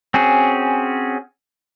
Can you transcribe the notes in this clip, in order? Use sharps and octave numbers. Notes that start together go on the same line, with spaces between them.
C4 C#4 F#4 G#4